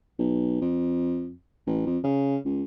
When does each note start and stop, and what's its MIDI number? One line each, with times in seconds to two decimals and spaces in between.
0.19 0.59 35
0.61 1.32 41
1.67 1.85 33
1.86 1.98 41
2.04 2.37 49
2.45 2.63 37